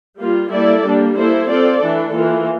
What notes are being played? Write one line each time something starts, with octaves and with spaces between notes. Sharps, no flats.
G3 A#3 F4
G3 A#3 E4 A4 D5
G3 A#3 D4
A#3 E4 A4 C5
C4 F4 A4 D5
E3 A3 D4 A4
E3 A#3 F4